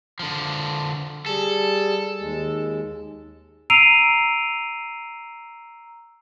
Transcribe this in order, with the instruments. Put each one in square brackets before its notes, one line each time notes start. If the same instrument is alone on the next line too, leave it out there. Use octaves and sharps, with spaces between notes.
[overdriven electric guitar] D3 F3
[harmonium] G3 G#4 [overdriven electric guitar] A4
[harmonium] D#2 G#3
[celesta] A#5 E6 C7 D7 D#7 F7